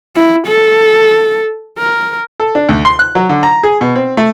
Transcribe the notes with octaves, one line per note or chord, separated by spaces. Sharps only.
E4
A4
A#4
A4
D4
D2
C6
F#6
F#3
D3
A#5
G#4
B2
C4
A3